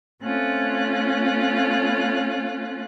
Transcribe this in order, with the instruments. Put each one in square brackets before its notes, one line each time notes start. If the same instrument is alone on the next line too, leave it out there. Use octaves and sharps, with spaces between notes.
[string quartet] A3 C4 C#4 F4 F#6